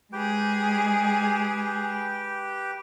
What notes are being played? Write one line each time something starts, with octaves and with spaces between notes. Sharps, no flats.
G#3 G4 G#4 B4 G5